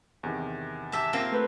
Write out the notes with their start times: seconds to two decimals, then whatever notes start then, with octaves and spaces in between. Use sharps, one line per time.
0.23 E2 C3 D#3
0.92 G4 E5 A5
1.13 A#3 C4 F4
1.32 A3 B4